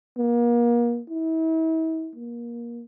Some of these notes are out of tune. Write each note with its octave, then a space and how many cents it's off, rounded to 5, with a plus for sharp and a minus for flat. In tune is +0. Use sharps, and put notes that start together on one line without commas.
A#3 +35
E4 -40
A#3 +25